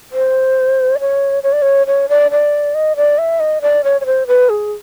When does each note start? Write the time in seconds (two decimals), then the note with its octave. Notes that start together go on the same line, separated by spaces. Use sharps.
0.12 C5
0.96 D5
0.99 C#5
1.43 C#5
1.53 D5
1.62 C#5
1.87 C#5
2.09 D5
2.31 D5
2.75 D#5
2.96 D5
3.18 E5
3.40 D#5
3.62 D5
3.84 C#5
4.01 C#5
4.06 C5
4.27 B4
4.49 G#4